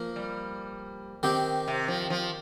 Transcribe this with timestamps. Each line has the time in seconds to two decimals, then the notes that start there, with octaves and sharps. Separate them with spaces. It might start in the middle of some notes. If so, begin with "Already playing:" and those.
Already playing: F3 A#3 A#4
0.16 G3
1.23 D#3 C4 G4
1.68 C3
1.88 F3
2.10 F3